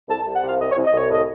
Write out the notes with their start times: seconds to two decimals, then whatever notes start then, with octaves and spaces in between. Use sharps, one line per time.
0.09 C2 A5
0.22 A5
0.26 C2
0.34 F#5
0.43 C3 F5
0.60 C2 D#5
0.72 C#5
0.77 C2
0.85 D#5
0.93 C2 C#5
1.09 A2 D#5